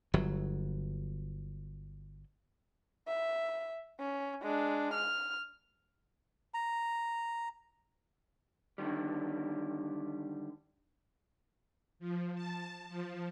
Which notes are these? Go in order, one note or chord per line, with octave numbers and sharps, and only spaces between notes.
G1 F#3
E5
C#4
G#3 D4
F6
A#5
D3 D#3 G3
F3
A5
F3